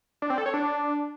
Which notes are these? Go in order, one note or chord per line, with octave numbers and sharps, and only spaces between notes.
D4
C4
A4
C#5
D4